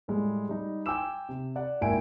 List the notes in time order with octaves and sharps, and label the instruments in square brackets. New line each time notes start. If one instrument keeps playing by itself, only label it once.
[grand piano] A2 G3 G#3
G3 D#4
G5 G#5 C6 D6 E6 E7
C3
D5 F#5
G#1 A#2 E4 G5 G#5 D7